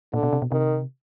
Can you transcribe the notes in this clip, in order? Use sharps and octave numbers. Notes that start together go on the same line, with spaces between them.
A#2 D3
B2
C3
B2
C3 D#3